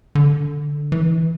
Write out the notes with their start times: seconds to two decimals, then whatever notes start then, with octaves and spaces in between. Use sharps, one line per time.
0.15 D3
0.92 E3